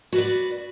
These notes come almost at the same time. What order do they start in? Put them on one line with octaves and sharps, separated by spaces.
F#4 B4 D5